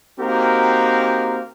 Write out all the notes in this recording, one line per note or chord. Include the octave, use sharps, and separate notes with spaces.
A#3 C4 D#4 F#4 G4 A#4